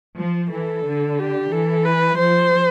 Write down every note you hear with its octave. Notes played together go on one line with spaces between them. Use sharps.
F3
E3 A4
D3
G4
E3 A4
B4
F3 C5